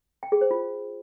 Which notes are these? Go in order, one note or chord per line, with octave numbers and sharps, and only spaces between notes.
G5
G#4
C5
F4